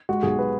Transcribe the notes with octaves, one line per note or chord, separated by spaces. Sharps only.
G#3 F#4
B1 G#4
B4